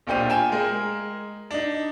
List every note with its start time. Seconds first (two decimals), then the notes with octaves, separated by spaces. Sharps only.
0.07 B1 A#2 D4 G4 C5 D#7
0.29 F4 G5 G#5 E7
0.52 G#3 A#4
1.51 D4 D#4